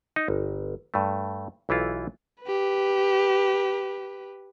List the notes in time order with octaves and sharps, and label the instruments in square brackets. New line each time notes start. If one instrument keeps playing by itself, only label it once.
[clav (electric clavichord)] D#4
G1
G2 A3
B1 E3 E4 F4
[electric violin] G4 B4